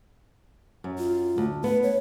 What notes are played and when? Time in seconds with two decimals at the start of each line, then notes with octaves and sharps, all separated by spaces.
0.84 F#2
0.98 F4
1.38 D2
1.64 B3 B4
1.83 C#5